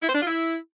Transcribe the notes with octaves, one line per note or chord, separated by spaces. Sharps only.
E4
C5
D4
F4
E4